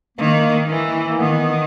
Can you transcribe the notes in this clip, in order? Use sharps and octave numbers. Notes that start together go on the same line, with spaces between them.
D#3 A#3
E3
A#3
D#3 B3